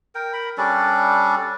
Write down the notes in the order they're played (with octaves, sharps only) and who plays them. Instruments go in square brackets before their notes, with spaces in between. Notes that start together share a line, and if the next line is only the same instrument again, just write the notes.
[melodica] A#4 G5
A#4 B5
G3 C#4 D4 A4